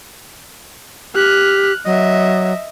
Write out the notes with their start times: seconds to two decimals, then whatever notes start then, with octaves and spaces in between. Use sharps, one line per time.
1.15 G4 F6 F#6
1.86 F#3 D#5 E5